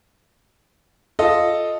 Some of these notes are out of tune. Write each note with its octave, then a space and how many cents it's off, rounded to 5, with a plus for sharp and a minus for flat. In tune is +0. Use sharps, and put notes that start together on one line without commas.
F4 +0 A4 +0 D#5 -5